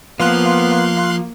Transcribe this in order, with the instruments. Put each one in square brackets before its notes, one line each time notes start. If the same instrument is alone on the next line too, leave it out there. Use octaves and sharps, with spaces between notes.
[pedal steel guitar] F3 [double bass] A#3 [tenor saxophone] B3 [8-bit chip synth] F5 C6 F#6